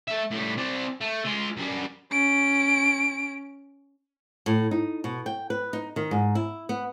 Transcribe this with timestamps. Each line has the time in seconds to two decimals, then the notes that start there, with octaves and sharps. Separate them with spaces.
0.08 A3 E5
0.31 A2 G3
0.57 C4 D5
1.01 A3
1.25 G#3 F4
1.57 F#2 G3
2.12 C#4 D7
4.46 A2
4.71 D#4
5.04 B2
5.26 G5
5.50 B4
5.73 D#4
5.96 D#3
6.11 G#2
6.35 E4
6.69 B3